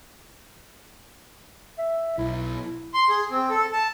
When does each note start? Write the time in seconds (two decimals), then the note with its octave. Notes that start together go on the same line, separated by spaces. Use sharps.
1.78 E5
2.18 B1 E4
2.94 C6
3.09 G#4
3.31 C4
3.50 A4
3.73 A5